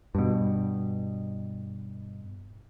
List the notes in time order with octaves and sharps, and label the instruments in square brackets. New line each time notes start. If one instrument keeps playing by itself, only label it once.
[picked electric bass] G2 B2